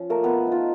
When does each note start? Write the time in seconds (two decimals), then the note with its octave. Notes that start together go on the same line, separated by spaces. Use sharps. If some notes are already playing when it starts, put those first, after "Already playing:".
Already playing: F3 C#4
0.10 A3 A#3 A#4
0.24 A3 B3 B4
0.47 D#4 F4